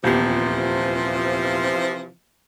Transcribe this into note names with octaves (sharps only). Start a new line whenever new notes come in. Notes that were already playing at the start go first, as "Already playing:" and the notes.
D#1 E2 C3 E3 F3 G4